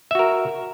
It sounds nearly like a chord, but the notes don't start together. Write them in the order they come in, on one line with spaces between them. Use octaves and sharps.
E5 F#4 A#4